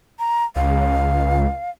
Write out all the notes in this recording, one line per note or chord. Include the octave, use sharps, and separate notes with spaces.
A#5
C#2 F5